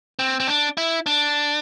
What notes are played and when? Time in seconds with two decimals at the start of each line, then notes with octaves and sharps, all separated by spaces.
0.19 C4
0.40 C4
0.47 D4
0.77 E4
1.06 D4